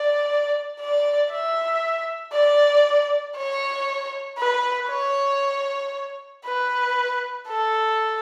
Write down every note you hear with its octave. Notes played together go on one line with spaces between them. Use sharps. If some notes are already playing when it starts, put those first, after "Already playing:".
Already playing: D5
D5
E5
D5
C#5
B4
C#5
B4
A4